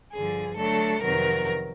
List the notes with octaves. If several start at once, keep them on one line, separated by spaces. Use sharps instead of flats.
G2 D3 F3 G#4
D3 F#3 A3 D4 A4
F2 C3 D#3 F#3 B3 A#4